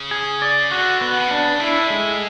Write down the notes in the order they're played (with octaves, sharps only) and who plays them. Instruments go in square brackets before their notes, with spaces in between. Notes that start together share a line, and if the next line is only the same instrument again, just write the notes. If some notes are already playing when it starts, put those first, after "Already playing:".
Already playing: [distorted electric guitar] C#3
[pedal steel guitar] G#4
D5
[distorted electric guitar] D3 [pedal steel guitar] F#4
[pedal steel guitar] B3
[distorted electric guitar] D3
C#3
[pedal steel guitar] D4
[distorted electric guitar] A2 [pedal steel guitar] E4
[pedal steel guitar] G#3